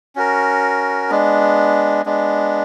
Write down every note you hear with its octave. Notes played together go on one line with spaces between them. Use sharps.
C#4 F#4 A#4
G#3 B3 D4
G#3 B3 D4